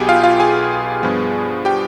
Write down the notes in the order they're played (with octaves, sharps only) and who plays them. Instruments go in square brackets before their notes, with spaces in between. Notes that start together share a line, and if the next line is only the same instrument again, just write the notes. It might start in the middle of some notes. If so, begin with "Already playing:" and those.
Already playing: [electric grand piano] B1 B2 B3 G4 G#4 G5 G#5
F4 F5
F4 F5
G#4 G#5
G2 F3 B3
G4 G5